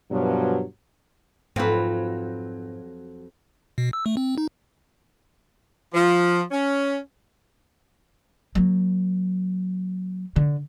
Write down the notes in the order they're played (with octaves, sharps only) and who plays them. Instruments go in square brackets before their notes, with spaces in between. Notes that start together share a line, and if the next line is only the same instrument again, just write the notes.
[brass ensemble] G2 B2 F3 F#3
[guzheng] F2 F#3 [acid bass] G#2 [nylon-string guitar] C4 F4 B4
[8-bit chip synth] B2
E6
A3
C4
D#4
[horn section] F3
C#4
[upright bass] F#3 A#3
D3